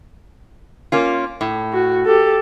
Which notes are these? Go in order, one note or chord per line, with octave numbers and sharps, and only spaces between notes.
A#3 C#4 F4
A2
F#4
G4 A4